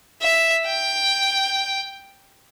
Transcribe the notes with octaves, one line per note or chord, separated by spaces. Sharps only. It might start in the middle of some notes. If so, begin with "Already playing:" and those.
E5
G5